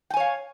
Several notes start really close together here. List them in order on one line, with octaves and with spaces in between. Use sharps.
G5 G#5 C#5 F5